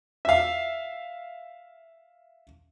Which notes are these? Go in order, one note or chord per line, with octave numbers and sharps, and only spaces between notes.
E5 F5